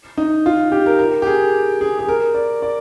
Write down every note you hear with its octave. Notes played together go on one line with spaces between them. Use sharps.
D#4
F4
G4
A#4
A#4
G4
G#4
G#4
G#4
A#4
D5
D5